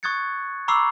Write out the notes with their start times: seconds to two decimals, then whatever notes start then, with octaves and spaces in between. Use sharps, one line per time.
0.03 C#6 D#6 F#6 G#6 A6 C#7
0.68 A#5 B5 C#6 D6 E6 C7